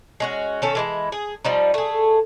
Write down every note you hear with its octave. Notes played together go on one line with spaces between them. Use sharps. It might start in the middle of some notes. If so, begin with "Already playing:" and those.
G#3 C#4 F#4
D#3 C#4 A4
E3 G#3 E4
G#4
F3 G3 D#4
A3 G#4